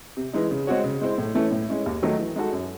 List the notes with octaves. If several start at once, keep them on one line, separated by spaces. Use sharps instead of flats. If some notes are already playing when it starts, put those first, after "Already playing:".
C3
E3 G#3 D#4
C#3
G#3 C4 F#4 C#5
C#3
G#3 C4 E4 C5
A2
E3 A3 C#4 E4
A2
G#3 C#4 E4
D#2
D#3 F#3 A3 D#4
E3
G#3 D#4 F#4 A4
F#2